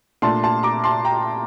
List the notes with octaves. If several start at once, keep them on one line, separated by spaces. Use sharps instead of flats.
A#2 A3 D4 A5 C6
A5 C6
A#5 D6
A5 C6
G5 A#5